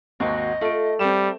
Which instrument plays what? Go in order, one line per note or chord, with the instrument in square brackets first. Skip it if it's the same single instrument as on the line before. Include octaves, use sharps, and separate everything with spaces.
[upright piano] G#1 D#2 [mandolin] F#4 D6 [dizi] D#5
[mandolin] A3 [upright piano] F4 D7
[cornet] G3 [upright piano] C4 A4 E7